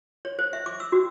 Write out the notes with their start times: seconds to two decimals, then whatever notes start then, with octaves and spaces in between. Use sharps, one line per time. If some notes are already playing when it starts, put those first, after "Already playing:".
0.25 C#5
0.39 C5
0.53 E5
0.66 D6
0.80 E6
0.92 F#4